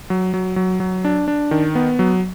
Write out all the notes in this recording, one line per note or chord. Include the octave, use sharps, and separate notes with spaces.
F#3
F#3
F#3
F#3
D4
D4
D#3
B3
F#3